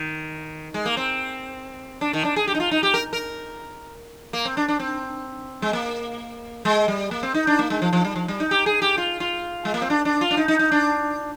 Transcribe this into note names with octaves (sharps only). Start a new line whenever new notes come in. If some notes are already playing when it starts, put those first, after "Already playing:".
Already playing: D#3
G#3
A#3
C4
D4
D#3
D4
G#4
G4
D#4
F4
D#4
G4
A#4
A#4
A#3
C4
D4
D4
C4
G#3
A#3
G#3
G3
A#3
C4
D#4
D4
A#3
G#3
F3
F3
G3
F3
G3
D#4
G4
G#4
G4
F4
F4
G#3
A#3
C4
D4
D4
F4
D4
D#4
D#4
D#4
D4